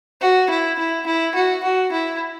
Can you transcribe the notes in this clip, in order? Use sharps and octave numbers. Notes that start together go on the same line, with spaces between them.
F#4
E4
E4
E4
F#4
F#4
E4